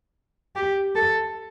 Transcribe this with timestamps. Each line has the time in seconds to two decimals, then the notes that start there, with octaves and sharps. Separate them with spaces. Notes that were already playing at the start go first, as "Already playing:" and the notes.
0.56 G4
0.95 A4